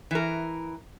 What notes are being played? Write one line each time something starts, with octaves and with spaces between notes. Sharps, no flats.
E3 A#4